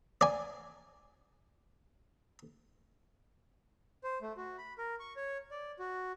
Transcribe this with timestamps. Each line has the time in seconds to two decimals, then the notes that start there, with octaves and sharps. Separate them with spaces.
0.21 D5 G#5
4.04 C5
4.22 A3
4.37 F#4
4.58 B5
4.78 A#4
5.00 C#6
5.16 C#5
5.51 D5
5.79 F#4